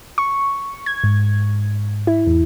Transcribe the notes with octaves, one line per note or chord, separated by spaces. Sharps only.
C#6
G#6
G#2
E4
E2